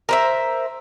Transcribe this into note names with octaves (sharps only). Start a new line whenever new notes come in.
A#4 C5 E5